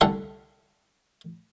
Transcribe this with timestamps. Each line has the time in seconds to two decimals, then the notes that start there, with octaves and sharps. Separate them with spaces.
0.01 C2 D3 A4 F5 F#5 C6